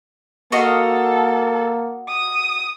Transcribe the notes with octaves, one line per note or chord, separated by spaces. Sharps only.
A#3 F#4 A4 D#5 F5
D#6